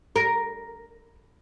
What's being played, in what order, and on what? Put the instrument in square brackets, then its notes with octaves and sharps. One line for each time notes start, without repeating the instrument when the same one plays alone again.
[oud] A#4